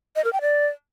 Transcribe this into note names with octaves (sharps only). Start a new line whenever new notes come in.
D#5
A#4
G5
D5